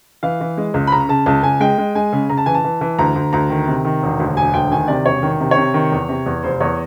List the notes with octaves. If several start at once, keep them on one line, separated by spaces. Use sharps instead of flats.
E3 F5
E3
G#3
C#2
B5
C#3 A#5
C#3 A5
C#2 A5
C#2 G#5
G#3 G5
G#3
G#3 G#5
C#3
C#3 A#5
A5
E3 G#5
A5
E3
E3
D2 A#5
D2
D2 A#5
D#3
C3
D#3
E1
D2
E1 G#5
D2 G5
D#3 G#5
C3 D5
E1 C#5
D#3
C3
C#5
C3
D#3
E2
C3
E2
F1 C5
E2 C#5